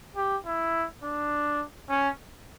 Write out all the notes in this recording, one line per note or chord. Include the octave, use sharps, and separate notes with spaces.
G4
E4
D4
C#4